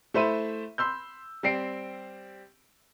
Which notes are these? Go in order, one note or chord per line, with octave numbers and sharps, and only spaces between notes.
A3 E4 C5 E5 B5 D#7
B5 C6 E6 G6
G3 C4 C7 D7